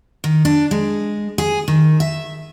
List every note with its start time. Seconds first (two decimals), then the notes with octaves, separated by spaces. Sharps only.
0.24 D#3
0.45 D4
0.71 G#3
1.38 G#4
1.68 D#3
2.00 E5